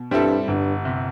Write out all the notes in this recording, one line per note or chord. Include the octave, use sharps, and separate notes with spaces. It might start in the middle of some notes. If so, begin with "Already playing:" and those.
Already playing: B2
G2 G3 C4 E4 A4
G1 G2
C3